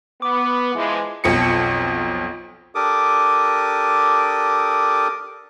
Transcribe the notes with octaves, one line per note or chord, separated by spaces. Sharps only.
B3 D6
E3 F3 G#3
B1 F2 C#7
D4 G4 A4 A#4 D6 D#6